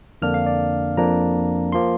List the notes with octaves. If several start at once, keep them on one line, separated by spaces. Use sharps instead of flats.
F2 D3 A#3 D4 F6
F5
D5
F2 F3 A#3 D4 A#5
F3 A#3 C6